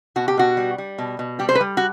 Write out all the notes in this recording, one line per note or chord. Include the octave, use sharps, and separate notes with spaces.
B2 F#4
G4
B2 F#4
G3
G3
B2
B2
G3 G4
C5
B4
G3
F#4